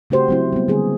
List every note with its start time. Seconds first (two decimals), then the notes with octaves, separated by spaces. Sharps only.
0.10 C#3 A3 F#4 G4 C5
0.28 F#3 C4 E4
0.53 G3 B3
0.68 D3 G3 A#3 G#4